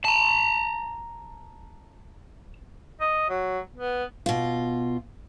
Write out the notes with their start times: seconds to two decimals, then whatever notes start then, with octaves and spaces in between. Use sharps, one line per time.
0.05 A5 A#5
3.01 D#5
3.29 F#3
3.77 B3
4.26 B2 F4